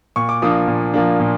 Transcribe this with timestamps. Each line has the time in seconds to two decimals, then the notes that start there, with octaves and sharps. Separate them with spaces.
0.16 A#2 C#6
0.29 D6
0.42 F3 A#3 D4 D#6
0.68 A#2
0.94 F3 A#3 D4
1.20 A#2